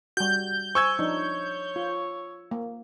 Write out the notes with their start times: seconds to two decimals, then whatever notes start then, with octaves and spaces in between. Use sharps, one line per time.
0.17 G3 F#4 G6
0.75 C5 G#5 C#6 E6 G#6
0.99 F3 D4 D#4 C#5
1.76 F4
2.51 A#3